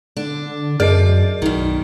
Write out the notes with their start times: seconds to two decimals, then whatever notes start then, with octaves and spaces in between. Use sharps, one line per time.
0.17 D3 D4
0.80 F#2 G#4 A#4 D5 D#5
1.42 B1 F#2 D#3